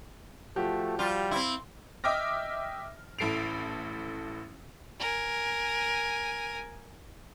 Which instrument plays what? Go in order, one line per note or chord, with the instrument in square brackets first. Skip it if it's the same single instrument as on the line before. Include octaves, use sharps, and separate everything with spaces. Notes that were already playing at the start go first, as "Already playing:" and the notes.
[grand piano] F3 F#4 G4 [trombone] A3
[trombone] G3 [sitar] F4
[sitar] C4 E4 [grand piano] C6
[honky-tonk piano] D#5 E5 G5 D6 F6 A#6
A1 E4 A4 C7 D7 F7
[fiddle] A#4 G#5